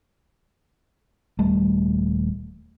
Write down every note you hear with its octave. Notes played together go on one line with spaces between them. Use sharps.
D#1 G3 A3